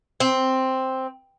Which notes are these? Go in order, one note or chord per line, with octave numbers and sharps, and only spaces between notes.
C4